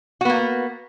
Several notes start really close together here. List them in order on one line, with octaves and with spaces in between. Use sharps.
F#4 B3 A#3